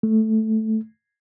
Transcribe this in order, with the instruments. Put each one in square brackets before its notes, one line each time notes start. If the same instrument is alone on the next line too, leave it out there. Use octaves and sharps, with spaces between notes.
[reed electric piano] A3